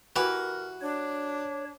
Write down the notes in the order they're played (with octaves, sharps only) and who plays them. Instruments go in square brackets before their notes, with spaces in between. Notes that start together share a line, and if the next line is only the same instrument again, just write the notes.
[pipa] E3 G4 B4 [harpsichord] F#4 [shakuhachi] A#4
[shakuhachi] D4 [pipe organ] C#5